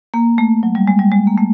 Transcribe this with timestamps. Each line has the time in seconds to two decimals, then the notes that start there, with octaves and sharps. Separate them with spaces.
0.14 A#3
0.38 A3
0.63 F#3
0.75 G3
0.88 G#3
0.99 G3
1.12 G#3
1.27 A#3
1.38 A3